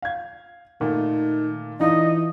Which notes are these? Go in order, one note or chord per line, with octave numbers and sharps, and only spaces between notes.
F5 G#6
A#2 D#3 A3
E3 D4 D#4 F4 D#5